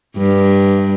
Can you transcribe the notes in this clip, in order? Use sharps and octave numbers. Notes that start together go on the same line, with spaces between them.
G2